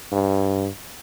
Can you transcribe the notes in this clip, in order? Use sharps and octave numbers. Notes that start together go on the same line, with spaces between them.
G2